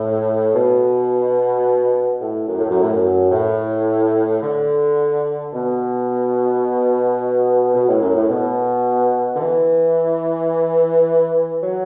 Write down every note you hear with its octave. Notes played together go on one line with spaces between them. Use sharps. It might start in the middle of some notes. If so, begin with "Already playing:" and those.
Already playing: A2
B2
A2
F#2
A2
F#2
A2
F#2
A2
D3
B2
B2
A2
F#2
A2
B2
D3
E3
F#3